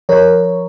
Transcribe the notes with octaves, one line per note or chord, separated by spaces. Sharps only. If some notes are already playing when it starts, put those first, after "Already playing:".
F3 A#4 C#5